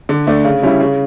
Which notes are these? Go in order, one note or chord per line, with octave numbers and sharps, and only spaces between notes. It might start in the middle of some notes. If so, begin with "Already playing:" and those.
D3
A3 D4
C#3
G3 C#4 E4
C#3